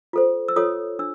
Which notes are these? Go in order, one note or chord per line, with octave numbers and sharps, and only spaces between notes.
F4 A4 C5
E6
F4 A4 C#5 D#6
D4 E6